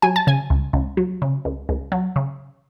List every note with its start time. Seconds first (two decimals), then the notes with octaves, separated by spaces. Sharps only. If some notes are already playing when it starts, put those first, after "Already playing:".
0.02 F#3 G#5
0.16 A5
0.27 C#3 G#5
0.50 C#2
0.73 C#2
0.97 F#3
1.22 C#3
1.45 C#2
1.69 C#2
1.92 F#3
2.16 C#3